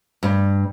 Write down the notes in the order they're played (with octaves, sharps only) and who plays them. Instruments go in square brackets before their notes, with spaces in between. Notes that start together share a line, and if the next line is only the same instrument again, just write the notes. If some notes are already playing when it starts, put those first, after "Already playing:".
[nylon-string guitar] G2